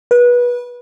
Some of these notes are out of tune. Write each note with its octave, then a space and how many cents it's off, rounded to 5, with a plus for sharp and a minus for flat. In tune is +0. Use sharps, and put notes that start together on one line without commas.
B4 -25